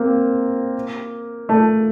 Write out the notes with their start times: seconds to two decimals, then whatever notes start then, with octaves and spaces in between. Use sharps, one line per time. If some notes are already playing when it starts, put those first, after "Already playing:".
Already playing: A#3 C4
1.49 A3